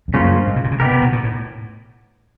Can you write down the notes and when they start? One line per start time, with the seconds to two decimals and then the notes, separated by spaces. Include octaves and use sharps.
0.08 F2
0.14 F#2 C#3 F3 A#3 C#4 F4
0.31 G2
0.47 G#2
0.56 B2
0.64 C3
0.71 C#3
0.80 C3 B3 D#4 G4 A#4
0.91 C3
1.02 B2
1.12 A#2
1.24 A2